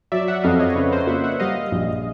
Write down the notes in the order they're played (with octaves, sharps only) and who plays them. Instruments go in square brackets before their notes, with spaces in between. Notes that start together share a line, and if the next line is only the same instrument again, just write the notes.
[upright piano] F#3 [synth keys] D5 E5
[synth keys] E5 F#5
[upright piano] F2 [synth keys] D#5 F5
[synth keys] C#5 D#5
[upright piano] C#3 [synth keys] B4 C#5
[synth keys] A#4 C5
[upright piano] A#3 [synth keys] E5 F#5
[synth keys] E5 F#5
[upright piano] G3 [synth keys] D#5 F5
[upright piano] A#1